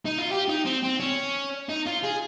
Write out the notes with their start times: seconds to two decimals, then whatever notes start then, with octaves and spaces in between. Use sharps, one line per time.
0.05 D#4
0.18 F4
0.31 G4
0.49 D#4
0.65 C4
0.83 C4
1.00 C#4
1.69 D#4
1.86 F4
2.03 G#4